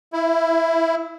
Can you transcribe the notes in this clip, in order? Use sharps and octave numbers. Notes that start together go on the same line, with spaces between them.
E4